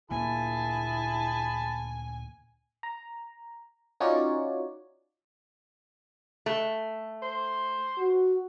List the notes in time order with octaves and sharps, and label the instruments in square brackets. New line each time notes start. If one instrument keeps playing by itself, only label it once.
[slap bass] D2 A#2 A#3 [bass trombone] E4 [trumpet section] G#4 A5 B5 [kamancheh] G#5
[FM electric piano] A#5
C#4 D#4 F4 F#4 C#5 D5
[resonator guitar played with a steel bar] A3
[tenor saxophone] C5
[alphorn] F#4